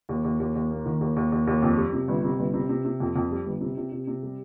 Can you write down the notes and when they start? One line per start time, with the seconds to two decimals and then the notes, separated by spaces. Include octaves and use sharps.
0.09 D#2
0.24 D#2
0.40 D#2
0.55 D#2
0.70 A#3
0.85 D#3
1.01 D#2
1.16 D#2
1.32 D#2
1.47 D#2
1.62 F2
1.77 G3
1.93 C3
2.08 G1
2.23 C3
2.39 G1
2.54 C3
2.69 C3
2.85 C3
3.00 F2
3.16 F2
3.31 G3
3.46 G1
3.61 C3
3.77 C3
3.92 C3
4.07 C3
4.23 G3